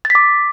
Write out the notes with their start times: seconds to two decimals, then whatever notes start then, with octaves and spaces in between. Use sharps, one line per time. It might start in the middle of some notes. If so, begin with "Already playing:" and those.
0.05 A6
0.10 B6
0.15 D6